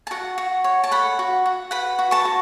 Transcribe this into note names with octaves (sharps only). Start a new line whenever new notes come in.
A5
F#4 F#5
F#4
C#5
A5
A4 F#5 B5
F#4
F#4
B4 F#5 B5
F#4
A5 C#6
F#4